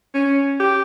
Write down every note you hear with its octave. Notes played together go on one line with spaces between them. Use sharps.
C#4
G4